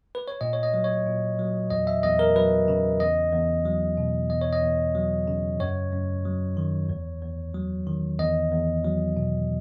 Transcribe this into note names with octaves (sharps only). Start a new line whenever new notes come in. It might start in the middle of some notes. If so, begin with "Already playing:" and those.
B4
C#5
A#2 D#5
C#5
D#5
F#3
C#5
A#2
F#3
E2 D#5
E5
E2 D#5
A#4
F#3 B4
C#3
E2 D#5
E2
F#3
B2
E2 D#5
C#5
D#5
E2
F#3
C#3
F#2 C#5
F#2
F#3
D#3
E2
E2
F#3
D#3
E2 D#5
E2
F#3
B2